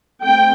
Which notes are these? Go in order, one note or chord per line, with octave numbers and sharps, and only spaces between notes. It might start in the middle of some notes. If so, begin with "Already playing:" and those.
A3 C4 G5